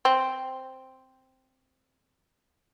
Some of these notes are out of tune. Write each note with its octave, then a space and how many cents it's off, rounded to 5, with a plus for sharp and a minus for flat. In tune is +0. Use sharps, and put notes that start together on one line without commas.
C4 +0